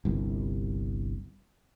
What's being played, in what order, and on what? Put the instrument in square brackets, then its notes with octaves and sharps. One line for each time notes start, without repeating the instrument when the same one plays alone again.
[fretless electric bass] G1 C2